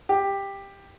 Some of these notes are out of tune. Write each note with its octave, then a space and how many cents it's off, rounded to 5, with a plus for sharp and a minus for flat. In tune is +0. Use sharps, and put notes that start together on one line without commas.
G4 +10